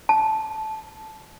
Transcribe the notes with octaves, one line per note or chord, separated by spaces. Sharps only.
A5